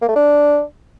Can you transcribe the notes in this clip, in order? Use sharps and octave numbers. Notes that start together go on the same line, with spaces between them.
A#3
A3
D4